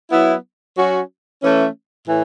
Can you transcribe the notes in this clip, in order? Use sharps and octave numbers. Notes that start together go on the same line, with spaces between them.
F#3 B3 E4
F#3 C#4 F#4
E3 A3 C#4
A2 E3